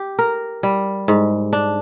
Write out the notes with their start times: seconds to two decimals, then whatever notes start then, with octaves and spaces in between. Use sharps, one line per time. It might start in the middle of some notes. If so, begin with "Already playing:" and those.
Already playing: G4
0.19 A#4
0.63 G3
1.08 G#2
1.53 D4